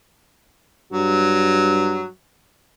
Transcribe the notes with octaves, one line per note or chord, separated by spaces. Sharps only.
G2 F#3